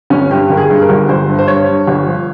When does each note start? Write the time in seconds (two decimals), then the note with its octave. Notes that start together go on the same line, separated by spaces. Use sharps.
0.10 G1 C#4
0.31 G2 G4
0.50 G1 A#4
0.57 G#4
0.70 G2
0.82 A#4
0.89 G1
1.09 G1 C5
1.28 G2
1.39 C5
1.48 G2 C#5
1.68 G2
1.87 G1
2.06 F3